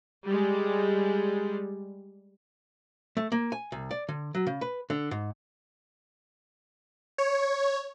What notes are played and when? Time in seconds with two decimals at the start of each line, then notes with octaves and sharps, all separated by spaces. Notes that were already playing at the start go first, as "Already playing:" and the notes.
0.24 G3 G#3
3.17 A3
3.32 A#3
3.52 G#5
3.72 C2
3.91 D5
4.08 D3
4.34 F#3
4.47 C#3
4.61 B4
4.90 D3
5.11 G#2
7.18 C#5